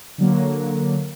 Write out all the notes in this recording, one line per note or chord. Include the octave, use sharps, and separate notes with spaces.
D3 F#3 A#3